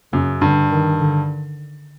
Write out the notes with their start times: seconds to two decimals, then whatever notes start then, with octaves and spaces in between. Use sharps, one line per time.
0.13 F#2 C#3
0.42 G2 D3
0.71 D#3
1.00 D3